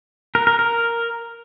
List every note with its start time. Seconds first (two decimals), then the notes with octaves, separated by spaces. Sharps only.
0.35 A#4
0.47 A#4
0.59 A#4